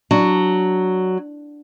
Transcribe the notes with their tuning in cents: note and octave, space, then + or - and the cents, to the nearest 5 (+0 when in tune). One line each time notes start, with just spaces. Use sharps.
F#3 +5 D4 +0